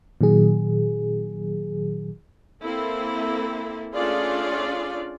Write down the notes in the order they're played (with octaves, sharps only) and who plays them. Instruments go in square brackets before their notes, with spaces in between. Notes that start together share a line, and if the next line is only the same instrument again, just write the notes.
[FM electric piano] A#2 D#3 F#3 G#4
[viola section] A#3 C4 E4 A4
A3 C#4 D4 F4 G#4 D5